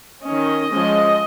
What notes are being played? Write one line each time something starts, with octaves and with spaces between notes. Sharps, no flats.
D#3 C#4 D#5
F3 G#3 C#4